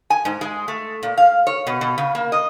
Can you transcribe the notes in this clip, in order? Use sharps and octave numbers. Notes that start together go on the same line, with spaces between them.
G#5
G#2
G#3
A3
A#2
F5
C#5
B2
B2
C#3
A#3
D#5